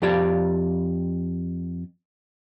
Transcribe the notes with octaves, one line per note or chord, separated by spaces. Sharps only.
F2 G4 D5 F5